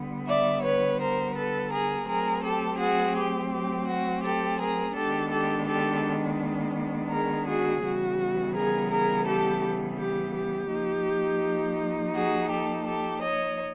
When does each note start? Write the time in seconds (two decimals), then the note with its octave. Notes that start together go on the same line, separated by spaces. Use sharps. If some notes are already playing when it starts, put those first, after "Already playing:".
Already playing: D3 G3 B3
0.28 D5 E5
0.64 B4 C#5
1.00 A#4 C5
1.36 A4 B4
1.72 G#4 A#4
2.08 F#3 A3 C4 G#4 A#4
2.43 G4 A4
2.80 F#4 G#4
3.16 G4
3.52 G4
3.88 F#4
4.23 G4 A4
4.59 G#4 A#4
4.95 D#3 G#3 B3 D4 G4 A4
5.31 G4 A4
5.68 G4 A4
7.11 G#4 A#4
7.47 F#4 G#4
7.83 C#3 E3 G3 B3 F#4
8.55 G#4 A#4
8.91 G#4 A#4
9.27 G4 A4
9.99 G4
10.35 G4
10.71 F3 A#3 D#4
12.15 F#4 G#4
12.51 G4 A4
12.86 G4 A4
13.22 C#5 D#5